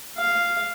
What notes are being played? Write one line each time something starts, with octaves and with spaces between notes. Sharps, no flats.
F5